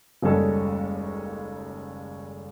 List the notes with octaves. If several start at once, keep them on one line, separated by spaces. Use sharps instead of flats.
F#1 D#2 G3 G#3 C#4 A4